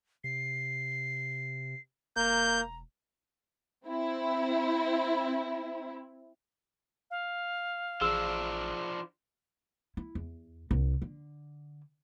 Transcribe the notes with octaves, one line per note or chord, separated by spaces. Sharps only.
C3 C7
E1 A#3 A#5 G6
C4 E4
F5
A1 F3 D4 G#4 E6 E7
E4
E2
C2
D3